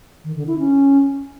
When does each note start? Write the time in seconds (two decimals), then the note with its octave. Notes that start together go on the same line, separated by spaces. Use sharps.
0.24 D#3
0.36 D3
0.47 E4
0.59 C#4